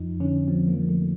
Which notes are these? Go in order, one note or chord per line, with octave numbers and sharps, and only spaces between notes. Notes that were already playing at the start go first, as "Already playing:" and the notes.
Already playing: F2 F3 D#4
D3 C#4
F3 C4
A#3
F3
A3